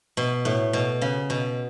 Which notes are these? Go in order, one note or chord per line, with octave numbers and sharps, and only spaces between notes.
B2
A2
B2
C#3
B2